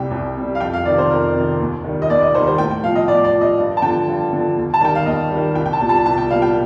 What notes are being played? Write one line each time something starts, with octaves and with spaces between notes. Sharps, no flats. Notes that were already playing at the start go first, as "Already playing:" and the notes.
Already playing: C2 C3 G3 G5
C2
C3 G3
F5
F2 G5
F5
C3 D#3 D5
C5
F2 A#4
C3 D#3
D#2
D#3 G3
D#5
D#2 D5
D#5
D#3 G3 C5
C5
A2 G5
G5
F3 F5
D#5
A2 D5
D5
F3
D#5
G2
A5
D3 F3 G5
G2
D3 F3
D#2
A5
D#3 G3 G5
F5
D#2 D#5
G3
D#3
C2 G5
G5
A5
A#2 G3
A5
C2 A5
G5
A#2 G3 F5
G5